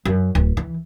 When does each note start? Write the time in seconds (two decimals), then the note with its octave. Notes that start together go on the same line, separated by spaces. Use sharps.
0.05 F#2
0.35 D1
0.57 E3